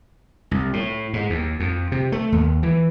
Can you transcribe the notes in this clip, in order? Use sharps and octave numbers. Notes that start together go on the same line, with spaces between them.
C2
A2
G#2
D#2
F2
C3
A3
D#2
E3